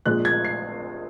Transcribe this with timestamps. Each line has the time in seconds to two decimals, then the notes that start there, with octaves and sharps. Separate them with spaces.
0.06 A#1 A#2 G#3 F#6
0.25 G#6
0.45 C7